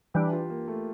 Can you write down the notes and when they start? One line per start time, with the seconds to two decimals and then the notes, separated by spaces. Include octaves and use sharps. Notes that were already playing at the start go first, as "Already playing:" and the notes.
0.14 E3 G3 D4 G4
0.32 F4
0.50 A#3
0.68 A3